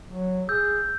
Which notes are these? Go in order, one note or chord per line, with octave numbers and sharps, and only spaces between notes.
F#3
G#4 E6 G6